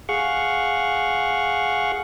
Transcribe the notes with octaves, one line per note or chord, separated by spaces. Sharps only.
G#4 F5 F#5 C#6